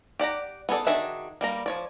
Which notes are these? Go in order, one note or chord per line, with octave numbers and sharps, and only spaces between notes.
G4 D5 F#5 A#5
B3 G#4 A4 D5
D#3 D4 F#4 G#4 E5
G3 A#3 A#5
F3 C#5 D5